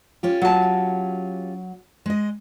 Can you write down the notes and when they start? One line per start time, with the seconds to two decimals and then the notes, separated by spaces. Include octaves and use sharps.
0.23 C#4 F4 G4
0.42 F#3 A5
2.06 G#3 D#5